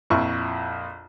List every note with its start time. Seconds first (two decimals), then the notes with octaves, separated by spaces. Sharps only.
0.10 A#1 F2 A#2 E4 E5 C#6